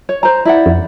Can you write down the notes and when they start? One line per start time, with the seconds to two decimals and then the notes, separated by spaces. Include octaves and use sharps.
0.09 C#5
0.23 C5 A#5
0.45 E4 D5 F#5
0.66 F2